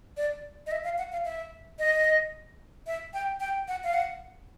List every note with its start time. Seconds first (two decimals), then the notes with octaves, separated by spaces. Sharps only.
0.17 D5
0.67 D#5
0.72 E5
0.84 F5
0.98 F#5
1.12 F5
1.25 E5
1.79 D#5
2.87 E5
3.14 G5
3.40 G5
3.68 F#5
3.84 F5
3.94 F#5